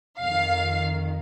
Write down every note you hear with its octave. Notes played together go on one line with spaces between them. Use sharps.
F2 D#3 F5